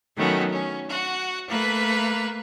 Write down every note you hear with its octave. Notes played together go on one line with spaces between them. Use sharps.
D#3 F#3 A3 B3 C#4
C#4
F#4 F#5
A3 A#3 B4